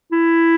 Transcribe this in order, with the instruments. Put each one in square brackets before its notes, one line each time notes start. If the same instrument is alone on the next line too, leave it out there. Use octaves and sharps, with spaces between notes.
[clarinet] E4